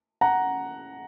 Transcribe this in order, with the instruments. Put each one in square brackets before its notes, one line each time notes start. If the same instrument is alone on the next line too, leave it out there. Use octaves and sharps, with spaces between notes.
[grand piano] F#5 A#5